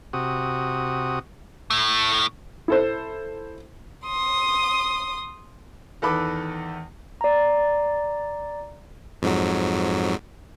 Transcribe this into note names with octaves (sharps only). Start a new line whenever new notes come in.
C3 F#4 D#6
A2 A3
E4 A4 C5
C6 D#6
E2 D#3 A4 B4 B5 D6
D5 A#5
F2 G#2 F#3